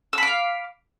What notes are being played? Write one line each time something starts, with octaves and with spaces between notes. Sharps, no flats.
F5 B5 D6 E6